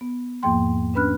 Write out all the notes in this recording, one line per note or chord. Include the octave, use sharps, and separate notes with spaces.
B3
E2 G#2 F3 A#3 G5 C6
C#4 D4 B4 B5 F6 F#6